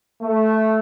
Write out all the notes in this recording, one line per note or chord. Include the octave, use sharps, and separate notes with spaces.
A3